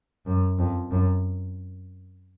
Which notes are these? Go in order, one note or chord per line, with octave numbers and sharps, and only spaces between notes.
F#2
F2
F#2